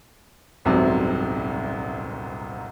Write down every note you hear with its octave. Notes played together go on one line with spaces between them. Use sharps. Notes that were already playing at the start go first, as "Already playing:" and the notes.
D#1 C2 G#2 C3 F#3 B3